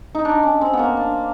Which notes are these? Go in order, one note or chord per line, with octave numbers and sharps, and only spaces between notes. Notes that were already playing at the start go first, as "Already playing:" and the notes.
D#4
D4
C#4
C4
B3
A#3
D4